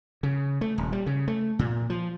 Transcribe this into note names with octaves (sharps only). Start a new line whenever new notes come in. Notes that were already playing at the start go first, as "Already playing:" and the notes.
C#3
A3
D#1
G3
C#3
A3
A#2
F3